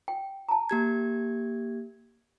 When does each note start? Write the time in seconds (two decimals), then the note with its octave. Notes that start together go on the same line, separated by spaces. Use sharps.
0.08 G5
0.48 A5 A#5
0.69 A#3 G4 G#6